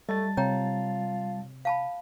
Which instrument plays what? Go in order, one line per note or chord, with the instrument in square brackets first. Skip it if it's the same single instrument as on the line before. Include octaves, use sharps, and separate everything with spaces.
[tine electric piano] G3 A5 A6 [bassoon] A3 [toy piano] D#5
[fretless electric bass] C3 [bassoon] F4 [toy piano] C#5 G5 A#5
[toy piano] F5 A5 B5